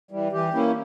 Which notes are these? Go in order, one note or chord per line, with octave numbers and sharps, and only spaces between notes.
E3 G3
E3 G4
A#3 C#4 E4